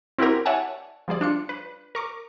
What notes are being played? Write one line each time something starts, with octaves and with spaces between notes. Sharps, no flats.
C4 E4 F#4 G4 A#4
C#5 D5 E5 F#5 G#5 A5
F3 G3 G#4 D5
D4 F4 C#7
B4
A#4 C#6 D6